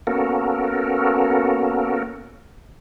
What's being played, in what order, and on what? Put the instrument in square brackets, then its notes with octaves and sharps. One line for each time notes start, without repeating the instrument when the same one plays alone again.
[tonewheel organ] A#3 B3 C#4 F#4 A4 A#4